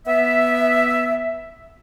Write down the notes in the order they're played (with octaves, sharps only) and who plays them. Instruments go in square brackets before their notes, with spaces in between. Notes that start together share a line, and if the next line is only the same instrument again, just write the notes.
[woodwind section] B3 E5